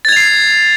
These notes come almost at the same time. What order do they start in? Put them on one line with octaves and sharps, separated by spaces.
A6 G#6 F7 C7